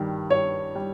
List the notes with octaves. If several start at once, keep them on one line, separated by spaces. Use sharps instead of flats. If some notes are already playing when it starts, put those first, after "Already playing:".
Already playing: G2 D#3 G3
G2 C#5
G3